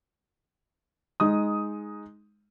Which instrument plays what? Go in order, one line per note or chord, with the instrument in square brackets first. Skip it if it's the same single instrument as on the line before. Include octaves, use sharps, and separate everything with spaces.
[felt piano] G#3 D#4 D#6